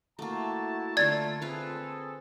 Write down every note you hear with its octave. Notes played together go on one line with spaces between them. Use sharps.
A3 A#3 E4 F#4 A5
D3 A3 F4 D5 E5 G#6 A6
C4 F4 G#4 A4 B4